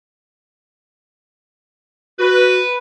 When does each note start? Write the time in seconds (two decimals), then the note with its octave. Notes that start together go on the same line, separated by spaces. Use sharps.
2.19 F#4 B4